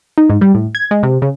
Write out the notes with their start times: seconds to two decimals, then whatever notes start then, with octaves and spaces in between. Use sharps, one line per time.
0.18 D#4
0.29 G#2
0.41 G3
0.54 A2
0.75 G#6
0.91 G#3
1.03 C3
1.22 C#3